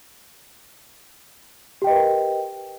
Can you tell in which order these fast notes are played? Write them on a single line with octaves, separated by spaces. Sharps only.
G4 G5 D#5 B4 A#4